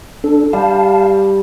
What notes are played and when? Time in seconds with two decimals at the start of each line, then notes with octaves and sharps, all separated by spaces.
0.24 D4 A4
0.53 G3 F5 A5